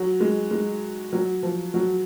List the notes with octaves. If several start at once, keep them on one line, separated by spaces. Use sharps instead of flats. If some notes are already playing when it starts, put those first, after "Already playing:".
Already playing: F#3
G#3
G#3
F#3
F3
F#3